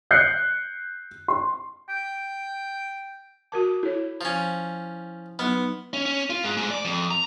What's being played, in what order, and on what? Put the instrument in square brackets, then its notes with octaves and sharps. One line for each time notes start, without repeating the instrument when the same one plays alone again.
[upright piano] F#6 G6 C7 C#7
C6
[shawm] G5
[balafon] F#4 A#4 A5 [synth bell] D6
[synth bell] E4 [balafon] A4 C#5
[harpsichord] F3 C#4
[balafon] F#3 D#4 [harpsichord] B3
[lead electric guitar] C#4
C#4
F4
G#2
G#2
D5
F2
A#5